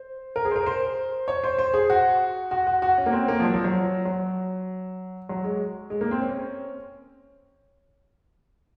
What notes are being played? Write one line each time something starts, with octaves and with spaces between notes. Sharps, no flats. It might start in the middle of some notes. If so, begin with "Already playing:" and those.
Already playing: C5
A#4
G#4
C5
A#4
C5
C#5
C5
C5
G#4
F#4
F#4
F#4
F#4
C#4
A#3
C4
A#3
F3
F#3
F3
F#3
F#3
F#3
G#3
G#3
A#3
C4
C#4